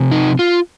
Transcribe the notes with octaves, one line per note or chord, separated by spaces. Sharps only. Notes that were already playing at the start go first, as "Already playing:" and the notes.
Already playing: C3 F3 C4
D#4
F4